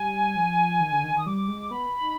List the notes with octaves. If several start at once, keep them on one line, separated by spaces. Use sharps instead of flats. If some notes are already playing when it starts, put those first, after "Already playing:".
Already playing: G3 G#5
F3
D#3
D3
D#3
D#3 D#6
G3 D6
G#3
B3 B5
D#4